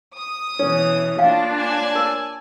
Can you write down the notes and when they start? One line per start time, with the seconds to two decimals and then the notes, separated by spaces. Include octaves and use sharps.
0.17 D#6
0.59 B2 E3 C#4
1.19 A#3 D4 F4 F5 G5
1.55 D5 G#5 A5
1.95 A#4